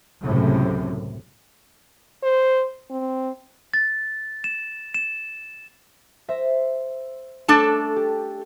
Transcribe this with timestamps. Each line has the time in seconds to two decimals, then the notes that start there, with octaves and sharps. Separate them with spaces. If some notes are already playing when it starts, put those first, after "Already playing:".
0.25 C#2 F#2 A2 C3
2.23 C5
2.90 C4
3.74 A6
4.44 E7
4.94 E7
6.28 C5 E5 A#6
7.48 A3 C#4 D4 A4 A5
7.96 G4